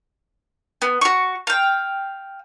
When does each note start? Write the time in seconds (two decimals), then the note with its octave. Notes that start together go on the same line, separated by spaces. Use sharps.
0.82 B3
1.01 F#4 C#6
1.47 F5 G5